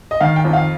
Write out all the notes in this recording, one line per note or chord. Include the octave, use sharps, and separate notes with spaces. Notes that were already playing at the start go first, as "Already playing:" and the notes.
D#5
D#3 F5
G5
F2
F5